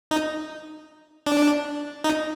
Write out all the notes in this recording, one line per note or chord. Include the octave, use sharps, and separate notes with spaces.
D#4
D4
D#4